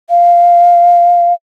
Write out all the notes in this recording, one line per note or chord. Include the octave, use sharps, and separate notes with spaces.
F5